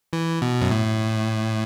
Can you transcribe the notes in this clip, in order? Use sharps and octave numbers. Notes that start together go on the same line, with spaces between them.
E3
B2
F#2
A2